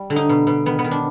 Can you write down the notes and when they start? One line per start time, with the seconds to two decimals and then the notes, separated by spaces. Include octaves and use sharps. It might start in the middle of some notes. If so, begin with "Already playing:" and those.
Already playing: G3
0.10 D3
0.16 D#4
0.29 B2
0.47 B2
0.66 D#3 B3
0.79 B3
0.84 D#3
0.91 D4